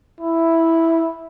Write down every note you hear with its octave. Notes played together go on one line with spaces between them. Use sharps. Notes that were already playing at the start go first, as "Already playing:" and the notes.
E4